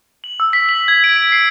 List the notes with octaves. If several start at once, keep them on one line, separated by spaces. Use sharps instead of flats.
F#7
E6
B6
F#7
G#6
D7
D7
C7